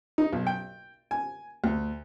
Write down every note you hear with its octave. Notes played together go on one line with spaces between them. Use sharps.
D#4
B1
G5
G#5
D2